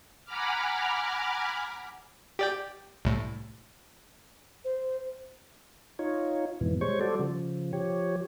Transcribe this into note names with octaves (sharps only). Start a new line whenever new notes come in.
F#5 G#5 A#5 B5 D6 F6
G4 D5 G5
C2 A2
C5
D#4 F4 C#5
F2 G#2 B2 E3
G3 G#3 C5 C#5 C#6
G3 F#4 A4 C5 D5
C#3 F3
F3 G4 C#5